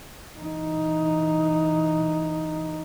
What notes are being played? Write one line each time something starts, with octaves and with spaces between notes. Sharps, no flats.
E3 D#4